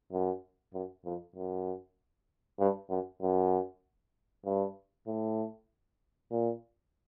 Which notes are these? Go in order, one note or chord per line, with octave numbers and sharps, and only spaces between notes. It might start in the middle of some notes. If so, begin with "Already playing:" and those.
F#2
F#2
F2
F#2
G2
F#2
F#2
G2
A2
A#2